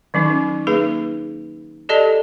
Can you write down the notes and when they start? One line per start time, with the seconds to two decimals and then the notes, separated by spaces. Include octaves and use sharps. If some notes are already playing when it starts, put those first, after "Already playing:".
0.14 D#3 F#3 C#4 D#4
0.67 A#3 D#4 G#4 B4
1.89 G4 A4 D5 D#5 A5